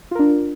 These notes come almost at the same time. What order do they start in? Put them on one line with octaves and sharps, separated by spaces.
F4 A#4 D4